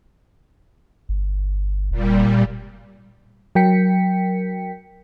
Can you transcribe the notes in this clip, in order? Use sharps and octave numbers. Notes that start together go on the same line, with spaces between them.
G1
F1 A#2 G3
F#3 A#4 G5 B6 C#7